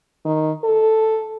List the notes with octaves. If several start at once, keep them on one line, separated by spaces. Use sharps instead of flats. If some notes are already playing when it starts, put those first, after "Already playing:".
D#3
A4